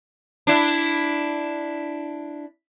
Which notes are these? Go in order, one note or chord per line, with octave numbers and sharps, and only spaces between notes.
D4 E4